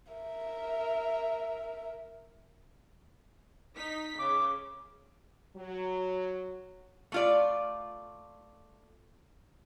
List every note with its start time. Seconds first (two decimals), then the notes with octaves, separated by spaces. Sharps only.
0.13 A#4 E5
3.76 D#4 B6
4.19 C#3 D6
5.56 F#3
7.12 A3 F4 D5